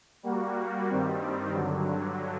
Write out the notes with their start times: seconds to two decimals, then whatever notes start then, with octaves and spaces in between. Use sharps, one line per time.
0.23 G3 A#3 F#4
0.89 G2 D#3 G3 C4
1.53 G2 D3 F#3